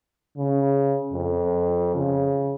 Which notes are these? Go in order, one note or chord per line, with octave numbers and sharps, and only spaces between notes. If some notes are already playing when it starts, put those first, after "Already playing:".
C#3
F2
C#3